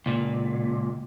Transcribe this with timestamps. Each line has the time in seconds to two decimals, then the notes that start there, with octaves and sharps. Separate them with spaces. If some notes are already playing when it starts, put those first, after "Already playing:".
0.06 C#2 A#2